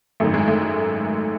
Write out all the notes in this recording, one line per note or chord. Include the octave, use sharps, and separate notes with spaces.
G#1 F#2 D#3 A3
G#3
A3